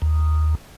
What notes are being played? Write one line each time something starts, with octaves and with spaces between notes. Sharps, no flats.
D#2